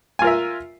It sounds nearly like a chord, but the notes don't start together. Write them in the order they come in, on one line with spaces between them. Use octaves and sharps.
G#5 F4 A#4 E5